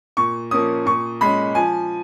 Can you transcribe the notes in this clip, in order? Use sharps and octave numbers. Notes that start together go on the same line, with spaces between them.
A#2 C#6
F3 A#3 C#4 D#6
A#2 C#6
G#3 C#4 B5
F3 G#5